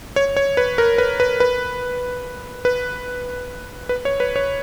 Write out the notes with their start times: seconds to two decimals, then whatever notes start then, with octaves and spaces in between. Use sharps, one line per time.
0.16 C#5
0.37 C#5
0.57 B4
0.78 A#4
0.98 B4
1.20 B4
1.40 B4
2.65 B4
3.89 B4
4.05 C#5
4.20 B4
4.36 C#5